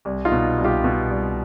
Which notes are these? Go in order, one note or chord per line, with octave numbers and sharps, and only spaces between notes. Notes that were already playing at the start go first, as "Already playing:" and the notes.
C2
D#4 F4
B2
C2
F4 G4
B2
C2